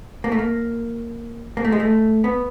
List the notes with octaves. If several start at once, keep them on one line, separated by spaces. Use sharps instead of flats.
A#3
A3
A#3
A#3
A3
G#3
A3
B3